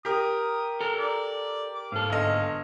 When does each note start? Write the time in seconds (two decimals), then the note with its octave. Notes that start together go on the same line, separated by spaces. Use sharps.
0.05 G4 A#4 D#6
0.80 A4 A#5
0.98 D5
1.75 D6
1.92 G#2 A4 F5
2.10 G1 D#5